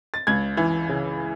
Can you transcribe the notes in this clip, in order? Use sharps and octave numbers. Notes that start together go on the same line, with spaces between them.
A6
C#2 G#6
E3
C#3